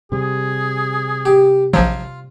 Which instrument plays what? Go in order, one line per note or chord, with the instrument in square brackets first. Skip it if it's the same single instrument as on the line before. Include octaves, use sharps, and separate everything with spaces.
[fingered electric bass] C3 G3 [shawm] G#4
[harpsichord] G4
[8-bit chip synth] A#1 F3 F#3 [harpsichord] F4